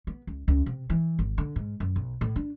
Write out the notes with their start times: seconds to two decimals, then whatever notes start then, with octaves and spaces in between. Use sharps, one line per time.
0.07 B3
0.27 C#2
0.48 C#2
0.66 C3
0.90 E3
1.19 G#1
1.38 D3
1.56 G#2
1.80 F#2
1.96 B1
2.21 A2
2.36 D4